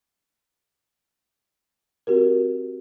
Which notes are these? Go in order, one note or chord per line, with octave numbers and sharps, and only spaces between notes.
C4 F#4 G4 A#4